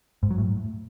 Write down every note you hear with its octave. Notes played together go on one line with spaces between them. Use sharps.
G#2
F#3
A2